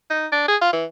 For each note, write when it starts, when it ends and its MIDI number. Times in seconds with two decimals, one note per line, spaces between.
0.10 0.27 63
0.32 0.46 62
0.48 0.56 68
0.61 0.72 65
0.73 0.85 52